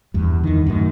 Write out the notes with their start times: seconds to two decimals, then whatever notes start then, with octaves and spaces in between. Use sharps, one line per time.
0.14 E2 G2
0.43 E2 D#3
0.66 F#2 A2 D#3